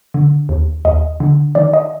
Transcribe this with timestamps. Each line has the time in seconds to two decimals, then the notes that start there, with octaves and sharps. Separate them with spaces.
0.14 D3
0.49 D#2
0.85 D#2 D#5
1.20 D3
1.55 D#3 D5
1.73 D#5